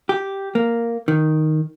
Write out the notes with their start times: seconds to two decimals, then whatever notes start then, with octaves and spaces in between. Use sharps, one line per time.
0.09 G4
0.55 A#3
1.08 D#3